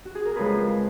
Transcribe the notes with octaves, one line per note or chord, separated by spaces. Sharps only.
F#4
G#4
A#4
F2 C#3 F3 G#3 G#4 B4